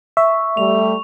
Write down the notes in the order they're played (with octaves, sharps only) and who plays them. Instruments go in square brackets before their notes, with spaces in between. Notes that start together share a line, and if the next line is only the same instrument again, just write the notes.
[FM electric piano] E5 [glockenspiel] C#6
[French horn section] G3 A3 [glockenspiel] F7